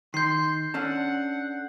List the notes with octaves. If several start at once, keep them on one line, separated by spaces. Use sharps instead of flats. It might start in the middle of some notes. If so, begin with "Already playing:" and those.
D#3 C6 G6 C7
C#4 D4 A4 F#5